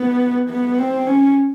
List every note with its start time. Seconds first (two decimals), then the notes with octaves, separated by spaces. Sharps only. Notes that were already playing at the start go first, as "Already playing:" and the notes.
Already playing: B3
0.50 B3
0.78 C4
1.07 C#4